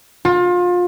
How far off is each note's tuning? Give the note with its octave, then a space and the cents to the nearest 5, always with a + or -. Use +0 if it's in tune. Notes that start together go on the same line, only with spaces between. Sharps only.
F4 +30